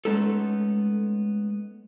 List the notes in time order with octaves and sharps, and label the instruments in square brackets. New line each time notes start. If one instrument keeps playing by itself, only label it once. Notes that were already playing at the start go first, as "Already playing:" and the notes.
[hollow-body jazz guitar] G#3 A3 B3 C#4 D#4 A4